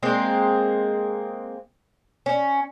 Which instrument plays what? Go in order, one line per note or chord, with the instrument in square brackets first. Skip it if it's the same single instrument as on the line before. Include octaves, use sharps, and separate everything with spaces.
[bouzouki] G#3 A#3 C4
C#4